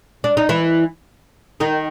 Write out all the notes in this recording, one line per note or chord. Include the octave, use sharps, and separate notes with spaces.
D4
D#4
E3 E4
D#3 D#4